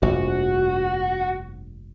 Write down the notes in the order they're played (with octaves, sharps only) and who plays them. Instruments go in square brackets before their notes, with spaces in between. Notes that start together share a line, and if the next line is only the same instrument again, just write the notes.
[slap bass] F1 A#1 G2 [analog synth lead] F#4